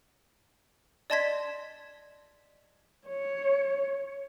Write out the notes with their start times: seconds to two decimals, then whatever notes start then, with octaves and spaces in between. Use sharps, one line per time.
1.10 D5 D#5 A5 C6 G#6 B6
3.07 C#5